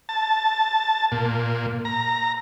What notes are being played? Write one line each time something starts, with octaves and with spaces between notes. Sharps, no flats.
A5
A#2
A#5